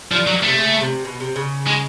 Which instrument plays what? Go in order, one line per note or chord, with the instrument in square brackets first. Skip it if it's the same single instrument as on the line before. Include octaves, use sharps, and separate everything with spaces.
[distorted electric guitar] F3 [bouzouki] G3
[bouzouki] D#3
[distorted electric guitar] F#3
[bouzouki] D#3
[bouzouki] C3 [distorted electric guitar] A3
[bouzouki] C#3
C3
B2
C3
C#3
[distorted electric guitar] G#3